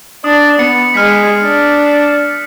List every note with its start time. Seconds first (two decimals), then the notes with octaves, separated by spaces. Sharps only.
0.24 D4 D#6
0.59 B3 C#7
0.94 G#3 F6 F#6 B6
1.42 D4